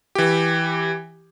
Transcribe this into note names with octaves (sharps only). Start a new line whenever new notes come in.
E3 G4